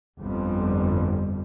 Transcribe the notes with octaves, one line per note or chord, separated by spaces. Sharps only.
G1 F2 G3